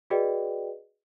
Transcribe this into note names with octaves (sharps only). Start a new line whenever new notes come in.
F#4 G#4 B4 D5 D#5 G5